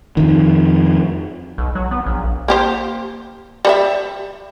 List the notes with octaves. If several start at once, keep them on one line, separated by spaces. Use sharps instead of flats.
F2 D#3
B1
F#3
B3
A#1
A#3 G4 C5
G3 B4 E5